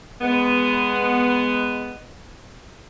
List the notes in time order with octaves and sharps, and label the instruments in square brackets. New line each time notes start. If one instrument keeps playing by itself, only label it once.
[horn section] G#3 B3